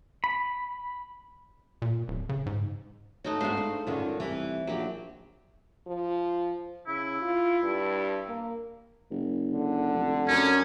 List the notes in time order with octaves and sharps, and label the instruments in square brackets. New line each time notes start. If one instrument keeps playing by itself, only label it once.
[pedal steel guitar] B5
[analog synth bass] A#2
D1
C#3
G#2
[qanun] A3 D#4 F#4 [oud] C#4
[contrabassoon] D2 [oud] G#3 B3 F#4 [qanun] C5 F5
[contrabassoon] G#2 [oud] D4
[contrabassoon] C#2 [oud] F#2 D3 D#3
[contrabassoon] C2 [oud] E3
[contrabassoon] A#1 [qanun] F#3 G4
[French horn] F3
[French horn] C#3 [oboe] E4
[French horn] F4
G2
A#3
[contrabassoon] F#1
[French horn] D3
[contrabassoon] F1
[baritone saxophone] F#2 [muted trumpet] C#4